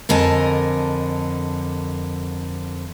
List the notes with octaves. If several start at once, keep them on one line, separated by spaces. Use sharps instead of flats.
F2 D3 A#4 D#5 G#5 A5